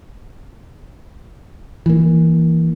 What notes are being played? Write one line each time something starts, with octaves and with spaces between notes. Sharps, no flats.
E3 A#3